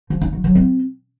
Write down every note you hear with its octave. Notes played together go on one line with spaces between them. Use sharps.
F3
D#4
F#3
F#3
C4